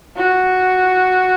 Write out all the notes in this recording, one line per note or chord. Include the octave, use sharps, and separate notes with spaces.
F#4